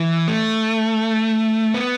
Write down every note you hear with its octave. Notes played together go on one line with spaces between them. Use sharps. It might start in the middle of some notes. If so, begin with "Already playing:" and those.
Already playing: E3
A3
B3